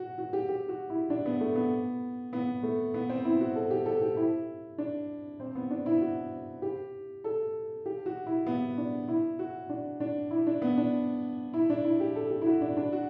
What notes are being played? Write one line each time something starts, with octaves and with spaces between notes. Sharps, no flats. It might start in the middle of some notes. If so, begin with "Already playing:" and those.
Already playing: F#4
F#4
G4
G4
F#4
E4
D4
B3
A3
B3
B3
A3
B3
C4
E4
F#4
A4
G4
A4
G4
E4
D4
C4
B3
D4
E4
F#4
G4
A4
G4
F#4
E4
B3
D4
E4
F#4
D4
D4
E4
D4
B3
D4
E4
D4
E4
G4
A4
G4
E4
F#4
D4
D4
F#4